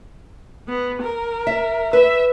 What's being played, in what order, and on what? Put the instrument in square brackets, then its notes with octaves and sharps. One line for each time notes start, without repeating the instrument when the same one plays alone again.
[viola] B3
A#4
[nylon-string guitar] E5
[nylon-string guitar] B4 [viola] E5